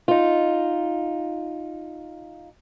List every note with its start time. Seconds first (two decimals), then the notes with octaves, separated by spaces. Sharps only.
0.08 D#4 F4